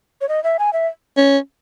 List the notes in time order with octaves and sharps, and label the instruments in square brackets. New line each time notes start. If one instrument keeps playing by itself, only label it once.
[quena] C#5
D#5
E5
G#5
E5
[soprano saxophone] C#4